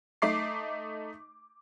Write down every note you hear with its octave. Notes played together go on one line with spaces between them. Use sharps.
A3 D#4 D6 C7